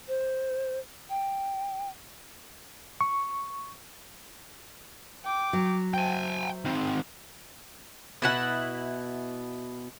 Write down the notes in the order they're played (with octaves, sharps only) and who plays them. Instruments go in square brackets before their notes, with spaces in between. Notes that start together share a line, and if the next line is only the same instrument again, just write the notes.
[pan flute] C5
G5
[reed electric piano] C#6
[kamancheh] G5 D6
[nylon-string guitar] F#3
[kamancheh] C5 E5 [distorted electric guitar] G5 G#5
[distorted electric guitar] D#3 C4
[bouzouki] B2 E4 F#5